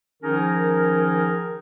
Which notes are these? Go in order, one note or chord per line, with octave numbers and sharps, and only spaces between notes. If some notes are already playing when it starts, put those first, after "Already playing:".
D#3 F3 C#4 D#4 G#4 A#4